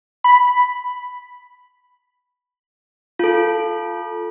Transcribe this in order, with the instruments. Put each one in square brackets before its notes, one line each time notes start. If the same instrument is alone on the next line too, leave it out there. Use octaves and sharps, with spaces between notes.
[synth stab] B5
[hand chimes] F4 A4